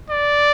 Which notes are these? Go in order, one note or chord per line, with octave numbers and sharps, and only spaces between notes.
D5